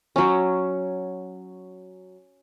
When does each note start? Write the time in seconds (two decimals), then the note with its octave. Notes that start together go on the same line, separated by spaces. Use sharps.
0.16 F#3 C#4